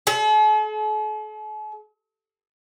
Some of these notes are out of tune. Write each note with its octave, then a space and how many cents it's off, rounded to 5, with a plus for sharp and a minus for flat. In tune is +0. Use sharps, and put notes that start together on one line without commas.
A4 -45